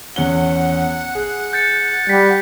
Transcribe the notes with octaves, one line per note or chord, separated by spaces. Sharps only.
E2 C#4 F#5 G7
G#4
G6 A6 C#7
G3 B6